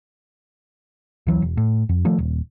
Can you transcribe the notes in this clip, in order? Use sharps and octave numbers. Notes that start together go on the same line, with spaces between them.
D2 E3 F#3
E1
A2
F2
D#3 F3 A3
D#1